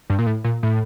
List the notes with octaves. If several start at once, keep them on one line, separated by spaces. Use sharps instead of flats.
G2
A#2
A2
A#2
A2